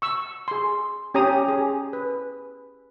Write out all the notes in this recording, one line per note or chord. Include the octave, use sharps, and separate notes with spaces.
C#6 E6
G#4 C6
C#4 G4 C#5 A#5 D#6
G#4
B4